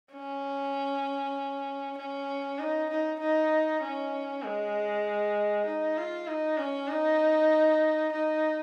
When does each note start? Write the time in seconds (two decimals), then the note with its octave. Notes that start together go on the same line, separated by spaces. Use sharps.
0.14 C#4
1.98 C#4
2.59 D#4
2.90 D#4
3.20 D#4
3.82 C#4
4.43 G#3
5.66 D#4
5.97 F4
6.28 D#4
6.58 C#4
6.88 D#4
8.12 D#4